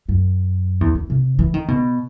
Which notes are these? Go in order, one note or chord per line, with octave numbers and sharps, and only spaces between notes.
F#2
E2
E2
C3
E3
D#3
B2